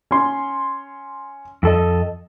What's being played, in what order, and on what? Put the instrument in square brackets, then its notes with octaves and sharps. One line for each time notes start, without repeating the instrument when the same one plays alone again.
[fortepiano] C#4 C6
[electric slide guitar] F2 A4 D#5